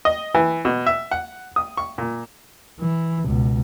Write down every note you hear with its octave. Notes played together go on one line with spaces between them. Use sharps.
D#5
E3
B2
E5
F#5
D#6
C#6
A#2
E3
C#2 B2